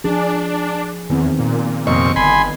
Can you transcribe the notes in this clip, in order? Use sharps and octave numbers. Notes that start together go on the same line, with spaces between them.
F3 D4 G#4
E2 D#3 B3 C4
A#2
F2 C3 B3 D#5 C#6
G1 G#5 B5 C6